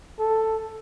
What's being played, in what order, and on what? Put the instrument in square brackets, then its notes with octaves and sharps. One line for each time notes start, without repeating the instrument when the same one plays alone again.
[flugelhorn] A4